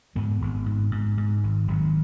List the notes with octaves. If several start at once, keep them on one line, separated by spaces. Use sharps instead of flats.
G#2 G#3 B3
G#1
G#2
G#2
G#2
G#1
G#1 D#3 F#3